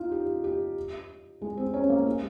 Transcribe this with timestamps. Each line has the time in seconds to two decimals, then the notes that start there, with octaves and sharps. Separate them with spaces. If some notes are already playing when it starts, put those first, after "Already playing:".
Already playing: D#4 F4
0.12 G4
0.44 G4
1.42 G#3
1.57 C4
1.74 C#4
1.89 A#3
2.06 G#3